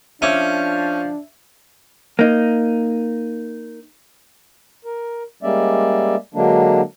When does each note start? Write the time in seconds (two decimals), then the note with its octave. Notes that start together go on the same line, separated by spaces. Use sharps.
0.22 F3 C#4 D4 E5 D6
2.19 A#3 D#4
4.85 A#4
5.43 G3 G#3 A#3 C#4 D5 E5
6.34 D3 F#3 G#3 A#3 D4